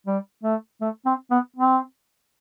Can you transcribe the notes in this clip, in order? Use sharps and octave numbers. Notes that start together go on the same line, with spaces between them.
G3
A3
A3
C4
B3
C4